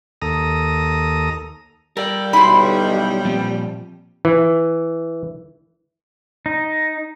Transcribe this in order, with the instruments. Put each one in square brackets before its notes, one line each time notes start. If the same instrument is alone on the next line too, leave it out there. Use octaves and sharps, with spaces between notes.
[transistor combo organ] D#2 A4 A#5 D#6
[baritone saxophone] G3 [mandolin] A4 [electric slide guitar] A#4 D5
[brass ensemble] B1 [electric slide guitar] D#4 E4 B4 [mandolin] B5 C6
[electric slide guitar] A#2 F3 C4
[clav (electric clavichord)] E3
[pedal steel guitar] D#4